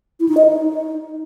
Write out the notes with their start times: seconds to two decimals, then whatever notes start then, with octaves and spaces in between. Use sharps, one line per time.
0.20 E4
0.29 D#4
0.37 D#5
0.46 D#4